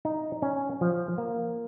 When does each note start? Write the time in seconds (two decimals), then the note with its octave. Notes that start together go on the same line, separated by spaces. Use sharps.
0.05 D#4
0.42 C#4
0.81 F3
1.18 A#3